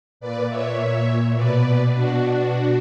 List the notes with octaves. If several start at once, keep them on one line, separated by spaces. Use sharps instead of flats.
A#2 B4 D5
C#5 E5
B2 B4 D5
D4 F#4